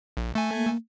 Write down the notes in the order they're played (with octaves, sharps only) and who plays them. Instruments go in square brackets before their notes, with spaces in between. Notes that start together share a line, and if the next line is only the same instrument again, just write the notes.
[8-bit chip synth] A#1
A3 G#5
[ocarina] A#3